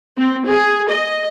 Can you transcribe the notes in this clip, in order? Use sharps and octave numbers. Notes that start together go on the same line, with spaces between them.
C4
G#4
D#5